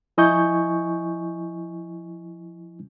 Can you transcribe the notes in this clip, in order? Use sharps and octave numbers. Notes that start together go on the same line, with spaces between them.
F3 E4 D#5 G#5 C#6 G6